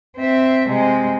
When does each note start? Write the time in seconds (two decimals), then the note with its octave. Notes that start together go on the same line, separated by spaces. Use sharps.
0.17 C4 E5
0.68 C3 G#3